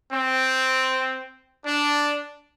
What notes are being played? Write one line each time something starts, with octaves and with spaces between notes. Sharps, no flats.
C4
D4